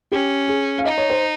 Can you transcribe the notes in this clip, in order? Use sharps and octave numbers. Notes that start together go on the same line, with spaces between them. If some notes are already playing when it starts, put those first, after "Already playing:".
C#4 G4
G#4
F5
D#4 D#5
C#5
C5